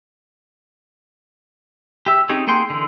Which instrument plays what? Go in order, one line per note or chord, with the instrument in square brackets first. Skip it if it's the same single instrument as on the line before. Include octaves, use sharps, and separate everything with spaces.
[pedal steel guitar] G4 E5
C4 C#4 D#4 G4 G#4
A#3 G#4 F#5 G5 C6
D3 E3